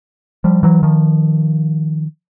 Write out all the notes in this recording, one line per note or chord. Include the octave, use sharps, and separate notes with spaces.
F3 G3
E3 F#3
D#3 F3